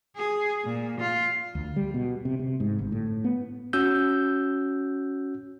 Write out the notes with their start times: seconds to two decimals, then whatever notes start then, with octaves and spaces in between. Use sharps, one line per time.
0.17 G#4
0.64 A#2
1.00 F4
1.55 D2
1.76 G3
1.94 B2
2.25 C3
2.39 C3
2.60 G#2
2.79 G1
2.92 A2
3.24 B3
3.73 C#4 F#4 E6 G6